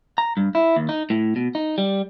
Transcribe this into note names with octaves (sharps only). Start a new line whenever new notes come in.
A#5
G2
E4
D#2
D#4
A2
B2
D#4
G3